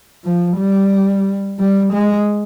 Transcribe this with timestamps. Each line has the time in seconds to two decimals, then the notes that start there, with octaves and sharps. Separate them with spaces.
0.24 F3
0.57 G3
1.59 G3
1.93 G#3